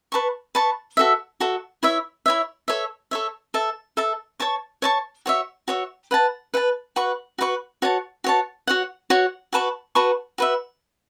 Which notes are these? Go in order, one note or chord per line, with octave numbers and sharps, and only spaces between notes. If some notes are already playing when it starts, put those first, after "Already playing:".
B4 A5 C#6
B4 A5 C#6
F#4 A4 E5
F#4 A4 E5
E4 C#5 E5
E4 C#5 E5
A4 C#5 E5
A4 C#5 E5
A4 E5 A5
A4 E5 A5
C#5 A5 C#6
C#5 A5 C#6
F#4 C#5 E5
F#4 C#5 E5
B4 F#5 A5
B4 F#5 A5
F#4 B4 F#5 C#6
F#4 B4 F#5 C#6
F#4 C#5 A5
F#4 C#5 A5
F#4 C#5 F#5
F#4 C#5 F#5
F#4 B4 A5 C#6
F#4 B4 A5 C#6
F#4 B4 E5